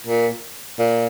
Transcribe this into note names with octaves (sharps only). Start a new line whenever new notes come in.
A#2
A#2